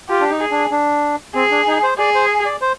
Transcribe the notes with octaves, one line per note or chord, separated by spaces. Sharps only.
F4 G4
D4
D#4
G#4
D4
D4
C4 G#4
D4
D#4
C5
G#4 D5
C5
D5
C5